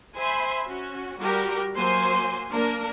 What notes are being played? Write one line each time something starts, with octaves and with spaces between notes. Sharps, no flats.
C5 E5 G#5 B5 C6
C#4 F#4
G3 F#4 G4 A#4
F#3 A#3 C5 G#5 C6
A#3 D4 A#4